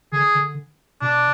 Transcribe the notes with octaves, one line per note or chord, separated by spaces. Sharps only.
D3 G#4
D3
B2 D4